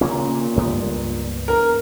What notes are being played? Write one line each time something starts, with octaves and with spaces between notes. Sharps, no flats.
A#2 C#3 A#3 C#4
C#2 G2 B3
A#2
E1 A#4